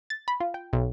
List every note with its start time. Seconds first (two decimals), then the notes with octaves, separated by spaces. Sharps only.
0.10 A6
0.28 B5
0.40 F4
0.54 G5
0.73 B1